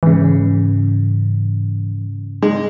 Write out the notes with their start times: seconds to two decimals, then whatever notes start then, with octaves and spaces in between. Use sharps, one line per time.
0.03 G#2 C#3 E3
2.42 G#3